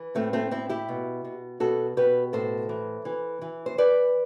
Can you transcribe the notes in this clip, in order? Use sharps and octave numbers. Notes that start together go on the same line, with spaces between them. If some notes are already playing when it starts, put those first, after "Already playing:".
Already playing: E3
A2 A3 C4
A3 C4
A2 C4 E4
E4 G4
B2
B2
B2 F#4 A4
B2 G4 B4
A2 A4 C5
E3
E3
E3
C5
E3 B4 D5